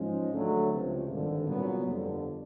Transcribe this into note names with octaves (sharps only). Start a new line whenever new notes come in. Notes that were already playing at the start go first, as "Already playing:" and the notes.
Already playing: G#2 F3 G#3 C#4
D2 D3 F#3 A3
C#2 C3 F3
G#1 G2 D3
C2 A#2 F#3 B3
G1 F2 D3